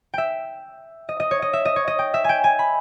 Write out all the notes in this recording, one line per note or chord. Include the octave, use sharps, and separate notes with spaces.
E5 G5
D#5
D#5
C#5
D#5
E5
D#5
C#5
D#5
G5
E5
G5 G#5
G#5
B5